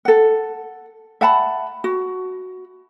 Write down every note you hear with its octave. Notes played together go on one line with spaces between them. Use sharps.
A4 F#5
E5 F#5 A5 B5
F#4